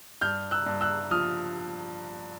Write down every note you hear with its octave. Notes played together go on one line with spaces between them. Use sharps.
G2 F6 G6
E6 F#6
G2
E6 F#6
F3 D#6 F6